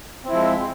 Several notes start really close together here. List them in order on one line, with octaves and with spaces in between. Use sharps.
C4 E4 F3 G#3